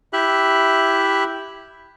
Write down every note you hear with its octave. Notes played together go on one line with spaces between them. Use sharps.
E4 G4 E5 F#6